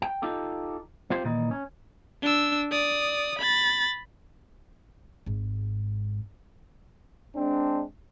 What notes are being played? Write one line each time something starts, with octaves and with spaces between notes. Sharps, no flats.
G5
D#4 F4 G4 A4
C4 F4 G4 C5
A#2 D#3 E3 D#4
C#4
D4 E6
D5 D#6
B5 A6
G#1 G#2
G#3 C4 D4